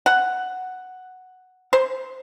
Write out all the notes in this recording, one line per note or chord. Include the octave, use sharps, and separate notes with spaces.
F#5
C5